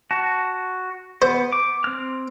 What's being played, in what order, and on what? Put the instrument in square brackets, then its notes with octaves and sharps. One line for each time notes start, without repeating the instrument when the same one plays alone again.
[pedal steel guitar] F#4 A5
[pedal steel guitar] B3 [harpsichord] C5
[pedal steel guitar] D6
C4 F6